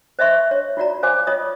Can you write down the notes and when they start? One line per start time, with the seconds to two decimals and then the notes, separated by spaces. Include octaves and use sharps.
0.19 C5 D#5 E5 C6 C#6
0.51 C#5
0.77 F4 F#4 D5 A#5
1.03 C5 F5 G#5 C6 D6
1.27 F4 C#5 D#5 D#6